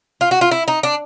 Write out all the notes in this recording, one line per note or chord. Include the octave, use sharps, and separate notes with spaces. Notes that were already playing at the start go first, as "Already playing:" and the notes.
F4
F#4
F4
E4
D#4
D4